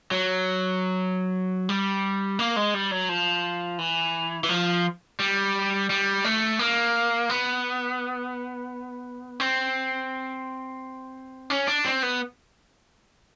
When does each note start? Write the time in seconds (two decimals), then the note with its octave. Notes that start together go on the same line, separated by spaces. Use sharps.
0.11 F#3
1.69 G3
2.39 A#3
2.56 G#3
2.74 G3
2.91 F#3
3.09 F3
3.79 E3
4.44 E3
4.49 F3
5.20 G3
5.90 G3
6.24 A3
6.59 A#3
7.29 B3
9.40 C4
11.50 C#4
11.68 D4
11.85 C4
12.03 B3